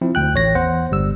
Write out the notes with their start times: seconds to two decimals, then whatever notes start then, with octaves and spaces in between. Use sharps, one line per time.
0.01 F3 C4 E4
0.15 D2 G5 F#6
0.35 A1 C#5 A#6
0.55 E2 C5 F#5
0.91 G1 G3 E6